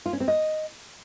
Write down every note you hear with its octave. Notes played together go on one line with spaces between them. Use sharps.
F4
C#4
C4
D#5